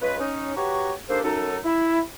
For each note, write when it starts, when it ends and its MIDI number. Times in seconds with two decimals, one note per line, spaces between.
0.02 0.18 49
0.02 0.18 56
0.02 0.18 65
0.02 0.18 71
0.19 0.54 61
0.19 0.54 63
0.55 0.91 66
0.55 0.91 67
0.55 0.91 71
0.55 0.91 73
0.55 0.91 82
0.55 0.91 85
1.09 1.22 51
1.09 1.22 58
1.09 1.22 62
1.09 1.22 67
1.09 1.22 69
1.09 1.22 72
1.23 1.57 42
1.23 1.57 63
1.23 1.57 69
1.64 2.00 64